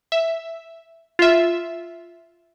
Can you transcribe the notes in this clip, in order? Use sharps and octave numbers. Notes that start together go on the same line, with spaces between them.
E5
F4 E5